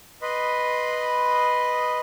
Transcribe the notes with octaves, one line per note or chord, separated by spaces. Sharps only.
B4 D#5 B5 C6